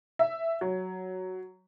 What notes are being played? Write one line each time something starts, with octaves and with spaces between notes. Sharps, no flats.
E5
F#3